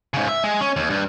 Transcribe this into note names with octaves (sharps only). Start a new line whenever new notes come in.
G#2 C#3
E5
G#3
C#4
D#2
G2